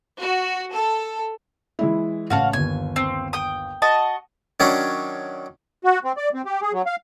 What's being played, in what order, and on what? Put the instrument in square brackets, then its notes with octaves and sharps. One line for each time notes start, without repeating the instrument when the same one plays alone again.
[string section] F#4
A4
[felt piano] E3 G#3 E4
[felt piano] A1 C#3 A5 [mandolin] F#4 F5
[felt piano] G1 D#2 [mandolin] G#5
[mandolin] C4
G5 D#6
F#4 D#5 A5
[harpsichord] D#3 F#3 C#4 D4
[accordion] F#4
C4
D5
C4
G4
G#4
F#3
F5